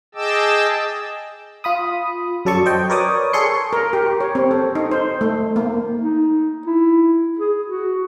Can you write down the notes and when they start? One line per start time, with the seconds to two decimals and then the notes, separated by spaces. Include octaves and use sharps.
0.15 G#4 D#5 G5 A5 D6 E6
1.64 F4 B5 D#6
2.45 F#2 F#3 A4 D5 A5 C#6
2.66 C5 D#5 G5
2.90 A#4 B4 C#5 D5 D6 D#6
3.33 G#4 A4 C#5 C6 C#7
3.73 A#4
3.93 G4
4.20 C#5
4.35 C4
4.51 A4
4.75 D#4
4.91 C5
5.21 A3
5.56 A#3
6.01 D#4
6.67 E4
7.39 G#4
7.67 F#4